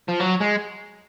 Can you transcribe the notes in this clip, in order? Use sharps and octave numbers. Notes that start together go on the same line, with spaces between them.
F3
F#3
G#3